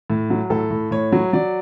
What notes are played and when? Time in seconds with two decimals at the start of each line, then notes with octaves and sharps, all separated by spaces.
0.10 A2
0.30 F#3
0.50 A2 A4
0.70 A2
0.91 A2 C#5
1.12 F#3
1.33 F#3 D5